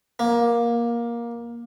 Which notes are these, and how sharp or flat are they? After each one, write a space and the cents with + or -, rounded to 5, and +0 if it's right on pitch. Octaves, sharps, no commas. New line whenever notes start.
A#3 +15